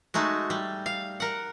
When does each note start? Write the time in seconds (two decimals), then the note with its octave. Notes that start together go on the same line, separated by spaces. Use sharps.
0.14 G#3 A3 D#4 F#4
0.50 G3
0.86 F5
1.20 A#4 F#5